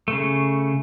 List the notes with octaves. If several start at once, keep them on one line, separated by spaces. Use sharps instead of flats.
C#3 A3